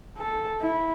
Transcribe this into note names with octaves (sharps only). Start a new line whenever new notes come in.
A4
E4